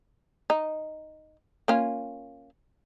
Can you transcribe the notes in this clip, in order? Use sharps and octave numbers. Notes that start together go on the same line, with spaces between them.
D#4
A#3 C#4 F4